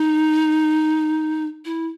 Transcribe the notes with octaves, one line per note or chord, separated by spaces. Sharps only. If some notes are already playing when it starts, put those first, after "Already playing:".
Already playing: D#4
E4